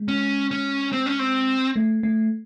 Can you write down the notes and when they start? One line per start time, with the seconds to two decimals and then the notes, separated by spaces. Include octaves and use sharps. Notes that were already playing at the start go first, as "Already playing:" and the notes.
Already playing: G#3
0.08 C#4
0.51 C#4
0.93 C4
1.06 C#4
1.19 C4
1.76 A3
2.03 A3